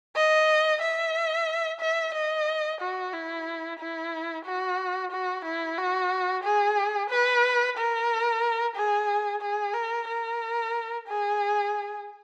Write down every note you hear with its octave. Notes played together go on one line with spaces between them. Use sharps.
D#5
E5
E5
D#5
F#4
E4
E4
F#4
F#4
E4
F#4
G#4
B4
A#4
G#4
G#4
A#4
A#4
G#4